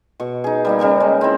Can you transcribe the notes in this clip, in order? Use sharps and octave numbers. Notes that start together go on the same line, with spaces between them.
B2 C#6
D#4 G#4
G3 A#3 D#4
C#3 G3 A#4 D#5
G#3
C4 E4